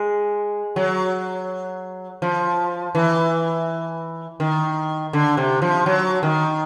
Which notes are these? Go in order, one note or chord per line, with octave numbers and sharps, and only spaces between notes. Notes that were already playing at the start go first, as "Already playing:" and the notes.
Already playing: G#3
F#3
F3
E3
D#3
D3
C3
F3
F#3
D#3